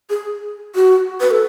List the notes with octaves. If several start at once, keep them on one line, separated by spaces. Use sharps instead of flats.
G#4
F#4
B4
A4